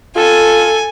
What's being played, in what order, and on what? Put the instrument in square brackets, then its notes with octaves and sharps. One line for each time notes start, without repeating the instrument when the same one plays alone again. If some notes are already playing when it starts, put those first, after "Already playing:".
[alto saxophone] F4 [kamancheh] A4 [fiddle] G#5